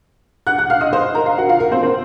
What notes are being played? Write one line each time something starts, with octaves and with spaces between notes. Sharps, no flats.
F#5 F#6
F#5 F#6
F5 F6
D#5 D#6
C5 C6
A#4 A#5
F5
F#4 F#5
F4 F5
A#4
C4 C5
C4 C5